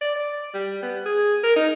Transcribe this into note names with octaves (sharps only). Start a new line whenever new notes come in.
D5
D5
G3
B3
G#4
A#4
D#4